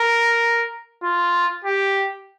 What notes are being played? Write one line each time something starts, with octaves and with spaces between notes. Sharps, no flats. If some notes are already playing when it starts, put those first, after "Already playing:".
Already playing: A#4
F4
G4